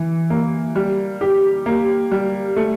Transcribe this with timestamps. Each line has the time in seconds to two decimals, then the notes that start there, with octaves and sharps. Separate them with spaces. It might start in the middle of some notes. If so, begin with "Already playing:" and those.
Already playing: E3
0.30 A#3
0.76 G3
1.21 G4
1.66 A#3
2.12 G3
2.56 A3